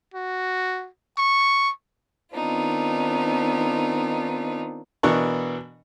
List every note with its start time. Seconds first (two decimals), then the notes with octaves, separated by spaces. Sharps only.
0.14 F#4
1.18 C#6
2.34 D#3 B3 C4 D4 D#4 F4
5.03 B2 E3 B3 D4 A#4 C#6